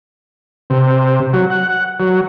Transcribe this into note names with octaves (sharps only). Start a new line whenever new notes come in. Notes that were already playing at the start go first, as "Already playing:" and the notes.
C3
F#3
F#5
F#3